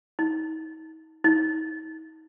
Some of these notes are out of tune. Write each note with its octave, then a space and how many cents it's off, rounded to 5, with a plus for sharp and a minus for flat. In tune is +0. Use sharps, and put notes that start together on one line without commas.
D#4 +40
D#4 +40